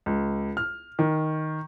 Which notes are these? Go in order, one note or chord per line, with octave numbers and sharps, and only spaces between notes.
C#2
F6
D#3